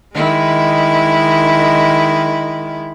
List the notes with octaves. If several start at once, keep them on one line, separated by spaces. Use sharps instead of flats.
D#3 G#3 E4